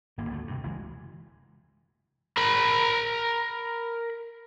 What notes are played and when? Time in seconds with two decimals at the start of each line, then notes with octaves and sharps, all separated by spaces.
0.18 G#1 A#3
0.29 D2 D3 E3 A3
0.47 G2 C3
0.63 F#1 E3 G#3
2.37 A#4 B5